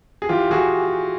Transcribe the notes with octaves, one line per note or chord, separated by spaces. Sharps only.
G#4
E3 F4 G4
E3 F#4 G#4